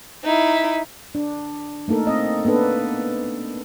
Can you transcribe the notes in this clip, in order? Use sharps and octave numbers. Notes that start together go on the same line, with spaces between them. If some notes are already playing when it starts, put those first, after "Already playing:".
D#4 E4
D4
A3 A#3 D#4 A4 A#4
C4 D#5
A#3 B3 D4 A4 B4